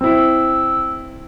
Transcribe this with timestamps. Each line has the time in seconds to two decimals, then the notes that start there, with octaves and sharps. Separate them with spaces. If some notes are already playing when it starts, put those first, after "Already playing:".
0.01 C4 E4 E6